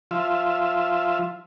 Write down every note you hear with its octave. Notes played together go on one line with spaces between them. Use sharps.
F3 F4 E5